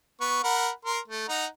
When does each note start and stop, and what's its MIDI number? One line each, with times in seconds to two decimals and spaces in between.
0.21 0.40 59
0.21 0.40 85
0.43 0.69 70
0.43 0.69 78
0.43 0.69 83
0.85 0.99 70
0.85 0.99 84
1.08 1.29 57
1.29 1.46 63
1.29 1.46 78
1.29 1.46 82